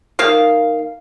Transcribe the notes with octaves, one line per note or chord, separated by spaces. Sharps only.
D#3 A#3 F5